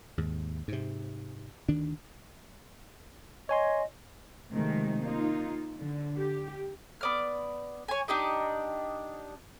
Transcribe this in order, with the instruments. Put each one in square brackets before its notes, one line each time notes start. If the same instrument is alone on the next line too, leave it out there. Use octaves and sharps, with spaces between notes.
[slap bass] D#2 G#2
G#2 C3
D2 D#3 D4
[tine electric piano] C#5 G#5 C6 [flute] D#5
[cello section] C3 D#3 F3 G#3 A3
A#3 D#4 F4
D3
G4
[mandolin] B3 D5 F6
C#5 G#5
D4 D#4 G4 D#5